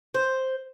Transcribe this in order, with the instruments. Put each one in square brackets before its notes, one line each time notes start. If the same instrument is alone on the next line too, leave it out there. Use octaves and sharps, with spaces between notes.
[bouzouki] C5